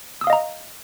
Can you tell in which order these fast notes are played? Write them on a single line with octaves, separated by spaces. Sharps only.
E6 D#6 F5 D#5 A#5